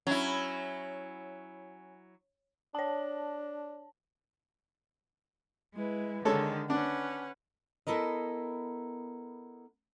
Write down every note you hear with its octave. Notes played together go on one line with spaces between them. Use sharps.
F#3 C#4 E4
D4 C#5 A5
G#3 E4 B4
D3 D#3 G#3 A4 C#5
C#4 D4 B4 F#5
B3 E4 A4 A#4 D#5